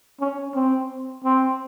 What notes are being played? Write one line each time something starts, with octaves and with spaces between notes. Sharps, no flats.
C#4
C4
C4